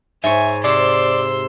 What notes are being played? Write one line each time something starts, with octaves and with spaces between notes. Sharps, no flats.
G#2 C#5 E5 G#5
C3 D5 C6 E6